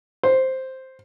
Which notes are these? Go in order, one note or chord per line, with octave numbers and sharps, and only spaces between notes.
C5